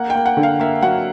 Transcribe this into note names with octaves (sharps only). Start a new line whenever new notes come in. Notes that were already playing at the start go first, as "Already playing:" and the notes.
Already playing: A#3 F#5
G5
A#3
F#5
D3
F5
A#3 E5
F#3 F#5